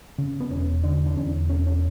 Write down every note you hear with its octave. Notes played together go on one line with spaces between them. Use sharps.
C#3
B3
E1 C#4
D3 D4
D4
E2 C#4
E1 C#4
C#4